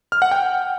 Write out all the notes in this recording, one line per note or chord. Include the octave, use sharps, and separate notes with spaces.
F6
F#5
G5